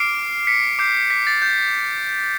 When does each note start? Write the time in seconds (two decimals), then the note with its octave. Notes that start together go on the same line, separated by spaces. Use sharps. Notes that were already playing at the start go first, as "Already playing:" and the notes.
Already playing: D6 F6 C7 D7
0.47 B6 C#7
0.79 D6 G6 C7
1.10 B6
1.27 A6
1.42 G6